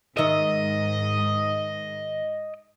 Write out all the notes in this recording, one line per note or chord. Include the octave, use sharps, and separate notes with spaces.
G#2 D#3 D#5 E5